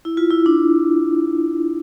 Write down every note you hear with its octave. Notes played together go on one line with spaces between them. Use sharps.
E4
F4
E4
D4